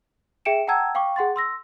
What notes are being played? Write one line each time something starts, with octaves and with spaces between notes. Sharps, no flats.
G#4 E5 G5 C#7 D7 E7
F#5 G5 A5 A#5 E6 G#6
F5 G5 C#6 D6
G#4 F#5 C6 A6
C6 E6 A#6